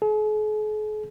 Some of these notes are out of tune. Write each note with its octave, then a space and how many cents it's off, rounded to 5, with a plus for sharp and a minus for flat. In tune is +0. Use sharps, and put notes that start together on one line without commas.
G#4 +45